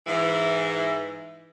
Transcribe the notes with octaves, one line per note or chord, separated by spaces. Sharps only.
G#2 E3